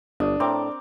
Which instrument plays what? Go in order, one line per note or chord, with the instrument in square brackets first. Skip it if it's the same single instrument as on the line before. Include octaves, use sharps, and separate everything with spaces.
[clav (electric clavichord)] G1 [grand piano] D4 [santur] D#6
[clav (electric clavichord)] A2 [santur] C4 A#4 D6